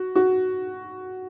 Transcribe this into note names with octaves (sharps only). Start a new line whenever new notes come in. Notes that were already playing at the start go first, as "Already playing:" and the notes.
Already playing: F#4
F#4